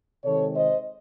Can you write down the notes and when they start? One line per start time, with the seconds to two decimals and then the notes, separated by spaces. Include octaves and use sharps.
0.24 C3 D#3 G#3 C4 A4 C#5
0.54 C5 D#5